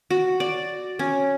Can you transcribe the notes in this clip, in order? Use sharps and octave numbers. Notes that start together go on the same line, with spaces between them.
F#4
D5
C#4